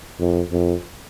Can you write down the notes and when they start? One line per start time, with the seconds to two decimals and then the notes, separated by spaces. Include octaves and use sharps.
0.19 F2
0.52 F2